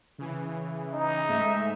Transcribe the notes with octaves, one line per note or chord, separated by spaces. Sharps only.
C#3 E3
D#4
G#2 A3 E5